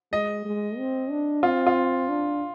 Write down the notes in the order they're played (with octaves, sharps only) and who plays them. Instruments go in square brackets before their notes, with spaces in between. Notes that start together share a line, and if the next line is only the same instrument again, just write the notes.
[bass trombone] G#3 [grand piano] D#5
[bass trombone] G#3
C4
D4
[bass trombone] C4 [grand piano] F4
[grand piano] F4
[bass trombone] D4